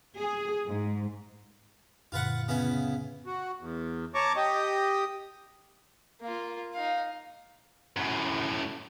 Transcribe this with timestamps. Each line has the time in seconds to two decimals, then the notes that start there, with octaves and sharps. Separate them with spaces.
0.19 G#4
0.67 G#2
2.12 F#2 A#2 D3 F4 B4 F#5
2.48 C#3 B3 E4
3.26 F#4
3.60 E2
4.15 C#5 A5 A#5 C#6 D6
4.36 G4 D#5
6.22 A#3 F4
6.74 D#4 F5
7.96 F#2 A2